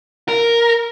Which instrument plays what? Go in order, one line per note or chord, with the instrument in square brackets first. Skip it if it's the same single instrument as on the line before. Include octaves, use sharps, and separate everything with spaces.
[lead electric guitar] A#4